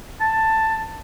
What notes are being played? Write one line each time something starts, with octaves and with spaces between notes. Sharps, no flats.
A5